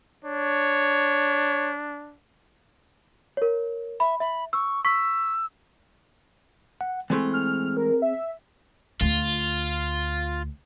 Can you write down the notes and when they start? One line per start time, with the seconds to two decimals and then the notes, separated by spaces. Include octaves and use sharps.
0.25 D4 C#5
3.37 A#4 C#5
4.00 E5 B5
4.20 E5 B5
4.53 C#6 E6
4.85 C#6 E6 B6
6.81 F#5
7.10 E3 G#3 A3 C4 G#4
7.34 F6
7.77 A#4
8.02 E5
9.01 D2 A3 F4